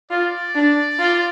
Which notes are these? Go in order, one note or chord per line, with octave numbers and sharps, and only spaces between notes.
F4 D5
D4
F4